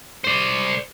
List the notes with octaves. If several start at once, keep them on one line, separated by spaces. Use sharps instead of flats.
C5 D5